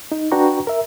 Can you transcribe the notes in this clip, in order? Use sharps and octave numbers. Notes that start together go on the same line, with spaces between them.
D#4
D4 F#4 B4 G5 A#5 C#6
A#4 E5